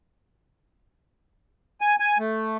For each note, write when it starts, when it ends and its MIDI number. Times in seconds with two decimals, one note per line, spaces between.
1.81 1.96 80
2.00 2.18 80
2.19 2.57 57